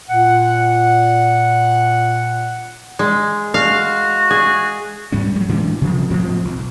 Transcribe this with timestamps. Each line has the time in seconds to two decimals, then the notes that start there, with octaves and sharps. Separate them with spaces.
0.09 A#2 F#5
2.99 G#3
3.54 F#4 F5
4.30 G#4
5.12 G#2 G3 C#4
5.36 F#3 G3
5.49 A2 E3 G#3 D4
5.81 C3 F3
6.10 A2 F3 F#3 C4
6.45 B1